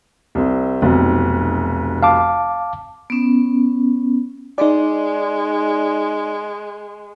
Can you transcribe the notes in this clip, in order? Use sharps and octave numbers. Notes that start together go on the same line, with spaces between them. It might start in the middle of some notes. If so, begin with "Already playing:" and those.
C2 C4
F1 B1 C4
F5 A5 D6
B3 C#4
G#3 D#4 D5